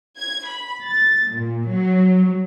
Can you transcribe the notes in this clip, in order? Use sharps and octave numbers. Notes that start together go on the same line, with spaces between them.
G#6
B5
A6
A#2
F#3